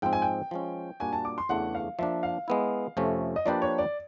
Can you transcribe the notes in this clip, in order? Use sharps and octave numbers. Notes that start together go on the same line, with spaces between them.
G#2 F3 G#3 C4 G5
G#5
G5
F3 G#3 C#4
A#2 G3 A#3 D4 F#4 G#5
A5
D6
C6
E2 C#3 E3 A3 D4 F#5
F5
F3 A#3 D4 E5
F5
G#3 B3 E4
F2 C3 F3 A3 C#4
D#5
F3 A#3 D4 G4 B4 D5
C#5
D5